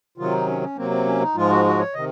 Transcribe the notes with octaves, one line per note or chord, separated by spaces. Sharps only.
C3 D#3 F#3 F4
D#4
C#4
C#4
C3 F#3 A#3 C4
C4
C#4
D#4
G#2 F3 G#3 F4
F#4
F#4
C#5
C3 D#3 D#5